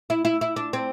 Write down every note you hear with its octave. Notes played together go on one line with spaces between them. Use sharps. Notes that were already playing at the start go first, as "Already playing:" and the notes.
E4
E4
E4
D4
C4